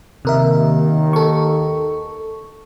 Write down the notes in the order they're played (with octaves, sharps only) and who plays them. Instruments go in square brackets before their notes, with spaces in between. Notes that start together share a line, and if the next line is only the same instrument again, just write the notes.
[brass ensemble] D#2 D#3 [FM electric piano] C3 A#4 E5
[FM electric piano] A4 C#6